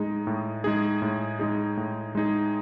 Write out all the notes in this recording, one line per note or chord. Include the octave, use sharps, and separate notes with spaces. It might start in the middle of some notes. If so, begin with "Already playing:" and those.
Already playing: A2 G#3 D#4 G#4
A2
G#3 D#4 G#4
A2
G#3 D#4 G#4
A2
G#3 D#4 G#4